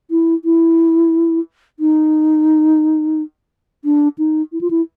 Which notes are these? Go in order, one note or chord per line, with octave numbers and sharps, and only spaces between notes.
E4
E4
D#4
D4
D#4
E4
F4
E4